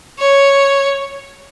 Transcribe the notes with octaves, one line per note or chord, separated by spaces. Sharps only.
C#5